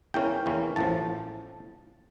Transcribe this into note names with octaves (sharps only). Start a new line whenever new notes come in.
E2 E3 A#3 C#4 G5
E2 E3 A#3 C#4
A1 A2 F3 A5